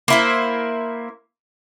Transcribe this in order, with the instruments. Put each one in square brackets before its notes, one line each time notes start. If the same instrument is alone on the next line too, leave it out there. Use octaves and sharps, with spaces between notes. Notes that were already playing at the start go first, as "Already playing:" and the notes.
[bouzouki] A#3 E4 C5